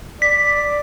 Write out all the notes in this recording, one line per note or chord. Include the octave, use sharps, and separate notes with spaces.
D5 B6